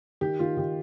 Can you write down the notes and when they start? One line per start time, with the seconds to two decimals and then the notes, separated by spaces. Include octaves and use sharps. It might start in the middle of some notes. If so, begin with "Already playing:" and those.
0.21 D#3 G4
0.39 D#3 F4
0.57 D#3 G4